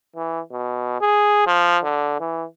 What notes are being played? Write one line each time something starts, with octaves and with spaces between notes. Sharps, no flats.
E3
B2
G#4
F3
D3
E3